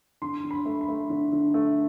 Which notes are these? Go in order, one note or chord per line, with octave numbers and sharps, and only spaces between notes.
D3 C6
D3
B5
A3
B5
A3
D3
D3
A3